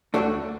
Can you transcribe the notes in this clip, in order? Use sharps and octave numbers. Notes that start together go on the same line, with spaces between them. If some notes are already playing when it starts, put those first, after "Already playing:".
D2 D3 A3 D4 F#4